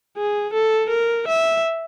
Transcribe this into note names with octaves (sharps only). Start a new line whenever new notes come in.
G#4
A4
A#4
E5